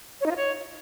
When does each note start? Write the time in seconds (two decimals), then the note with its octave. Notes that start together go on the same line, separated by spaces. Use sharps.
0.21 C#5
0.26 D#4
0.31 F4
0.36 C#5